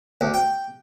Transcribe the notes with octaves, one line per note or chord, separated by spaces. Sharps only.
D2
G5